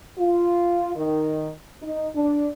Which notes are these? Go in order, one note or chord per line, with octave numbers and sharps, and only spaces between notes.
F4
D#3
D#4
D4